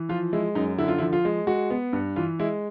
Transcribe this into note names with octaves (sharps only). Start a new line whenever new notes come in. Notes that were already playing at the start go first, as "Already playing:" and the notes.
Already playing: E3
F3 F4
G#3 E4
F#2 D#4
D3 E4
F4
E4
F3
F4
G#3
G#3 F#4
B3
G2
E3 F4
G#3 E4